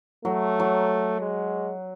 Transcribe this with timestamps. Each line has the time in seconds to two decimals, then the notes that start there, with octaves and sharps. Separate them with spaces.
0.25 F#3 A3
0.60 F#3
1.20 G#3